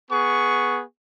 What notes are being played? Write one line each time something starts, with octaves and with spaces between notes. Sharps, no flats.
B3 G#4 C#6